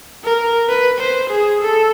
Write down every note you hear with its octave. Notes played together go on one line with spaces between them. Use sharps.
A#4
B4
C5
G#4
A4